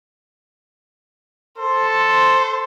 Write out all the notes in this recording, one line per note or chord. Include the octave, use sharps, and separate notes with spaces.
A4 C5
C5